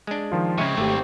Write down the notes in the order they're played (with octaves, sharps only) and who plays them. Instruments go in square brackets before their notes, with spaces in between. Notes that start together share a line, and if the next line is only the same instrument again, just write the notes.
[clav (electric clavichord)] G#3 D4
[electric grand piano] D#3 F3 F4
[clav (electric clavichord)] C#3 G#3 [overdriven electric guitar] C4 C#5 [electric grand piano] E5 C#7 D#7
[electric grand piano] G#1 G4 [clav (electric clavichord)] A3